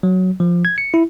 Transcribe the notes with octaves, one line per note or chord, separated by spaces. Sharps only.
F#3
F3
G#6
C#7
E4